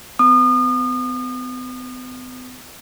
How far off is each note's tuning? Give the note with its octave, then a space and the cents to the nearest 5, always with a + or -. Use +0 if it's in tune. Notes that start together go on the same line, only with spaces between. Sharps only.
B3 +45 D#6 -35